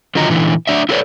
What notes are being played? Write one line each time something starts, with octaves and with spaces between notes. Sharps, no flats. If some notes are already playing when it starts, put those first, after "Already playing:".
D3 D#3 F#3 F4 D#5 A#5
A#2 D3 E3
F#3 D4 D5 E5
E4 F4 A4 B4 C#5 D5